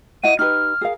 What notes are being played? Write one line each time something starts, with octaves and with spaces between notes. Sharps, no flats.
E4 D#5 F#5 D#7
D#4 G4 B4 F6
G#4 A#4 F5